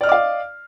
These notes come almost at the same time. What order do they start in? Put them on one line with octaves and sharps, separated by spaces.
D5 F6 D#5 D6 F5